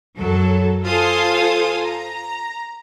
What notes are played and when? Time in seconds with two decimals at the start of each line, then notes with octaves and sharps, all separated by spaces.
0.17 F#2 F#3 A4
0.85 F4 A4 C5 F5 G#5 D#6
1.84 A#5